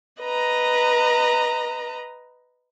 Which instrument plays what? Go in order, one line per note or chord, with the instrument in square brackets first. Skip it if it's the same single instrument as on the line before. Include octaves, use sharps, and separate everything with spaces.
[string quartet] B4 D#5 A#5